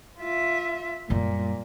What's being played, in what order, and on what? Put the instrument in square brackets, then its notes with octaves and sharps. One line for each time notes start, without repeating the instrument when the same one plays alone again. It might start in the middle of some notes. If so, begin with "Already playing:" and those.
[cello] F4 E5
[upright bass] F#2 G3 [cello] A#2